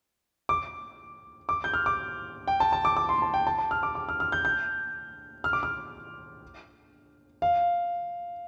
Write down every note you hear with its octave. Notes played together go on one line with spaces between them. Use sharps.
D6
D6
G6
F6
D6
G5
A5
A5
D6
D6
C6
A5
G5
A5
A5
F6
D6
D6
F6
F6
G6
G6
F6
D6
F6
F5